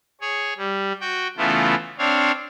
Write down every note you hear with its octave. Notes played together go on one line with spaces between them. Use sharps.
G#4 C#5
G3
F#4 G5
C#3 E3 A3 B3 E4 F4
C4 D4 C#5 F5